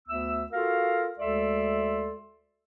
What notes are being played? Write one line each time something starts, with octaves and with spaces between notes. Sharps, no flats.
D2 B3 E5 E6
F4 F#4 A4 A#4 F5
D2 G#3 A4 D5 E5 C6